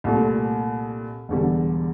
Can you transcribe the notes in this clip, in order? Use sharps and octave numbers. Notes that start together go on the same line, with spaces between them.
C2 A#2 A3
E1 E2 D3 G3